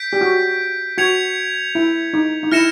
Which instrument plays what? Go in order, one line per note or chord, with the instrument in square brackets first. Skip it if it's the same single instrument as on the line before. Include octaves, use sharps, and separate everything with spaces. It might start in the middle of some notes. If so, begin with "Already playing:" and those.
Already playing: [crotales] G6 B6 D7
[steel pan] G4
F#4
[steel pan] F#4 [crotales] G#6 C#7 F7
[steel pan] E4
D#4
D#4
[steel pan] E4 [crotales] F6 A#6 C#7 E7